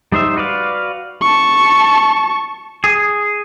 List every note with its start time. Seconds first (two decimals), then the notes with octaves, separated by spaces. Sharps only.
0.12 G3 D#4 C5 E5
0.36 F#4 B4 D5 F5
1.21 A5 C#6
2.84 G#4